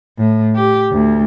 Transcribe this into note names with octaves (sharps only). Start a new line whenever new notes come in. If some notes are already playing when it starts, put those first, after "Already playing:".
A2
G4
D2